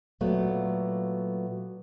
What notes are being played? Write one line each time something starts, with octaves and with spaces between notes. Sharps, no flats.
A#2 F#3 A3 B3